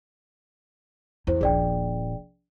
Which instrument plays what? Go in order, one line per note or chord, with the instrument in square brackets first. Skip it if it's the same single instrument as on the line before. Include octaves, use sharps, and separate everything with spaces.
[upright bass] E2 [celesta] E4 C5
[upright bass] D#1 A#1 [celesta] G#4 D5 G5